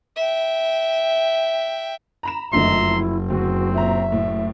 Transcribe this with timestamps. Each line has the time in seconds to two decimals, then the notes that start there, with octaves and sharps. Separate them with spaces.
0.16 E5 G5
2.23 A#5 B5 E7
2.53 F#1 F2 D3 D#3 A3 E5 A#5 C6
2.88 E4
3.30 D2 C4 F#4
3.74 A#2 E5 A#5
4.12 A2